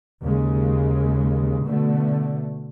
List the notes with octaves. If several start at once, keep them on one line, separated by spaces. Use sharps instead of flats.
D#2 C#3 G#3
B2 D3 A3